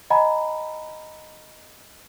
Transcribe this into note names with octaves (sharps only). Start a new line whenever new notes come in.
D#5 F#5 G#5 A#5 B5